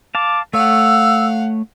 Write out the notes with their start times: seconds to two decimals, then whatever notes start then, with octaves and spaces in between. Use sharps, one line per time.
0.15 F5 A5 D6
0.54 A3 C#5 F5 F#5 E6